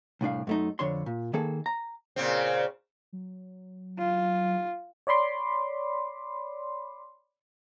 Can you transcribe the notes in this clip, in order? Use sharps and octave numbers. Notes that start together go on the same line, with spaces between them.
C2 A2 D4 F5
F#2 A3 D#4
F2 D3 C#5 C6
A#2
D#3 A#3 G#4 A4
A#5
A#2 C#3 C4
F#3
F4
C#5 D5 B5 C6 D6